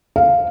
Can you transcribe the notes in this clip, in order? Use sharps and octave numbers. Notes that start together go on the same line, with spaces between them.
F5